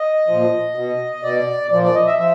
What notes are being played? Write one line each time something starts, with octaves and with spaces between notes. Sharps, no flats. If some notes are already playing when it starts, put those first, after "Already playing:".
Already playing: D#5
A#2 F3
B2
B2 D5
A#2 F3 D5
D5
D#5
E5
F3 E5